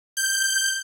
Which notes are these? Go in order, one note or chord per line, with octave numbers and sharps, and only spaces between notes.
G6